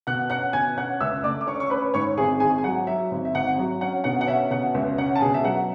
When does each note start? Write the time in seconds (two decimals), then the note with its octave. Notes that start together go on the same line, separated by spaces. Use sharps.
0.07 B2 F#5 F#6
0.30 C#4 F#5 F#6
0.53 B2 G#5 G#6
0.77 C#4 F#5 F#6
1.01 C#2 E5 E6
1.24 A3 D5 D6
1.41 D6
1.47 C#4 C#5 C#6
1.60 C#6
1.70 C#4 B4 B5
1.94 G#2 C#5 C#6
2.18 G#1 G#4 G#5
2.40 G#1 G#4 G#5
2.58 G#5
2.64 F#3 F#5
2.87 F#3 E5
3.11 G#1
3.25 E5
3.35 G#1 F#5
3.58 F#3
3.81 C#4 F#5
4.04 B2 F#5
4.21 F#5
4.27 C#4 E5
4.51 B2 F#5
4.74 C#2 E5
4.98 C#4 F#5
5.16 A5
5.21 B2 G#4 G#5
5.34 E5
5.45 F#3 F#5